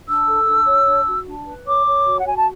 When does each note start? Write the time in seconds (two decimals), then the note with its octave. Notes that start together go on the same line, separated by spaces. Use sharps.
0.07 D4 E6
0.27 A4
0.47 D4
0.66 C#5
0.87 D4
1.06 F#4
1.26 D4
1.46 B4
1.65 C#5 D6
1.86 C#5
2.06 F#4
2.18 F#5
2.26 F#4 G#5
2.36 A5